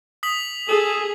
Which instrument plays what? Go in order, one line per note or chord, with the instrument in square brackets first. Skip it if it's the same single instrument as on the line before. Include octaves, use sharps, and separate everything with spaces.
[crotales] D#6 B6 F#7
[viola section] G#4 [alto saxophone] A4